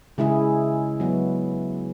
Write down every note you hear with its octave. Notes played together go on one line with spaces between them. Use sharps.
C#3 G#3 E4 G#4
F#3 B3 F#4